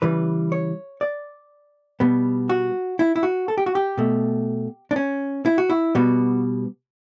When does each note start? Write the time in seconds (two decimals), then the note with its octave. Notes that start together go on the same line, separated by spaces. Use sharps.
0.02 C#3 E3 G3 B4
0.52 C#5
1.01 D5
2.00 B2 G3 B3
2.49 F#4
2.99 E4
3.16 E4
3.23 F#4
3.48 A4
3.58 G4
3.66 F#4
3.75 G4
3.98 B2 A3
4.91 D4
4.96 C#4
5.46 E4
5.58 F#4
5.69 E4
5.95 B2 G3 B3 F#4